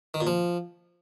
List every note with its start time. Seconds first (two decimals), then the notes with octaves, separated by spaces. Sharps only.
0.14 D#3
0.21 A#2
0.27 F3